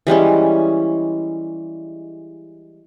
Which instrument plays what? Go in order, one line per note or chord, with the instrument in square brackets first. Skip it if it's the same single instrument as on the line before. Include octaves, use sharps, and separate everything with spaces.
[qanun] E3 G3 G#3 C#4